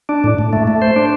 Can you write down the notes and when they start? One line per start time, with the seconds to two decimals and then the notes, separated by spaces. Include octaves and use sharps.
0.09 D4
0.24 A2
0.38 A2
0.53 A3
0.67 A3
0.82 C5
0.96 D4